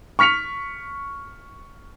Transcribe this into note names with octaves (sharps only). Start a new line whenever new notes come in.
C#6 F6 B6 C#7 F7